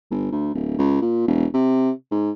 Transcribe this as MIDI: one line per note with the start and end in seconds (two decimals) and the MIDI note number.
0.11 0.28 31
0.32 0.51 38
0.55 0.78 26
0.79 0.99 37
1.02 1.23 46
1.28 1.46 28
1.54 1.91 48
2.12 2.31 44